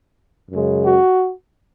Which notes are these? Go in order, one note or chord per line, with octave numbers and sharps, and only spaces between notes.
F#2 C#3 G#3
F#4